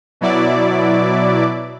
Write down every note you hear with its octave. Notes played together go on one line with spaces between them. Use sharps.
B2 F#3 E4 D5 D6